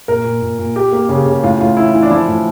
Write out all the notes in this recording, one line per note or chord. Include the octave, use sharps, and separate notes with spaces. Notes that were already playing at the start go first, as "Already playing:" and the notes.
A#2 A#4
A#2
A#2
A#2
A#3 G4
A#3
C#3
C#3
A2 F4
A2 F4
E3 E4
E3
D4
F3 E4
A2